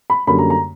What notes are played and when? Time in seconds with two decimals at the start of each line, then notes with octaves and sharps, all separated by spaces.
0.10 B5
0.27 F#2 D3 G3 A#3 B5
0.39 A#5
0.50 A#5